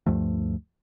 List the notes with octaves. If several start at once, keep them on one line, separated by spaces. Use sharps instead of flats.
D2 G2 F3 A3